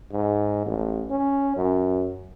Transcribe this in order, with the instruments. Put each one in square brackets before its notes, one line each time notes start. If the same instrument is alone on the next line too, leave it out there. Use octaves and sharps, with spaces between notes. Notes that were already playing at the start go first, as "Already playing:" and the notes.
[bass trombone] G#2
A1
C#4
F#2